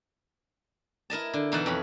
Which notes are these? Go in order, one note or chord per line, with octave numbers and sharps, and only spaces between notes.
E4 A#4 D#5 A5
D3
B2 E3 D#4 D#5 F#5 A5
F2 C#5 B5